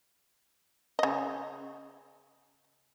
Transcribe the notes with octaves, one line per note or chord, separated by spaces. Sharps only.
C#3 D#5